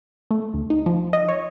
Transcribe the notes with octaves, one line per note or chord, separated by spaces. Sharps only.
A3
D2
D#4
F3
D#5
C#5